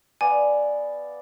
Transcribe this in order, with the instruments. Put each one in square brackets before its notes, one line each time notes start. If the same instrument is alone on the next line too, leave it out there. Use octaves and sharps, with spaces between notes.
[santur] B3 D5 F5 [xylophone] G#5